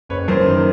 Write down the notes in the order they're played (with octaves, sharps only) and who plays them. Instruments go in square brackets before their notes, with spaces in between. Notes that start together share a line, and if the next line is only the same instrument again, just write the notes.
[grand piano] F#1 B4 C#5
F#2 A#4 C5
D#3 A#4